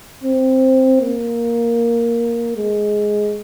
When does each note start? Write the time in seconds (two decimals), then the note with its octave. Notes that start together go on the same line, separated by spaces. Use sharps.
0.23 C4
1.01 A#3
2.57 G#3